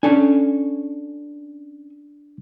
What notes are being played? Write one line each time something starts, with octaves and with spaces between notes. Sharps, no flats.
C#4 D4 A4 G#5